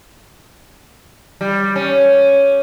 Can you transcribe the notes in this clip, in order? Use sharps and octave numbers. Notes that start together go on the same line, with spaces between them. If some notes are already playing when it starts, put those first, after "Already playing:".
G3
C#4